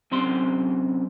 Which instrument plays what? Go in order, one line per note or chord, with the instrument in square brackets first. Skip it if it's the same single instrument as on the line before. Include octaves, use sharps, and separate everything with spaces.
[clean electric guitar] F#2 C3 C4 C6